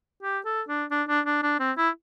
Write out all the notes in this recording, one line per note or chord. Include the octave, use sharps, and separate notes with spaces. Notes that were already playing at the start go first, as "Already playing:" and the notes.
G4
A4
D4
D4
D4
D4
D4
C4
E4